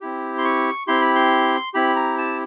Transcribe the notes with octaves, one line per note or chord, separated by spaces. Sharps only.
C4 E4 G4
C6
C#6
C4 E4 G4 C6
B5
C6
C4 E4 G4 B5
A#5
A5